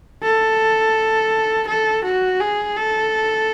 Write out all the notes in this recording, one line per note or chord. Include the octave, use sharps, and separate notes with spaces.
A4
A4
F#4
G#4
A4